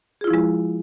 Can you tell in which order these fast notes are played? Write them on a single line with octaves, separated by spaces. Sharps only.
G#4 F4 E4 F3 G#3